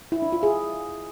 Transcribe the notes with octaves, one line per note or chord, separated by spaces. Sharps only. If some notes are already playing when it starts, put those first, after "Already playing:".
E4
D4
F4
G#4